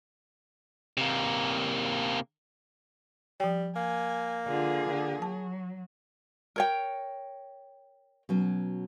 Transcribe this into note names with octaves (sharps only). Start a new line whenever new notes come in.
C3 A#3
F3 G3 G5
A#3 G#5
D3 F4 G#4
D3 A#4
F#3 A5
A#4 C#5 G5
B2 F#3 C#4